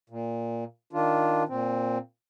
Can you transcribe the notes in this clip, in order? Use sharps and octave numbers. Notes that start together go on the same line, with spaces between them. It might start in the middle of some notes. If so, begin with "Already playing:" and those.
A#2
D#3 D4 F4
A#2 C4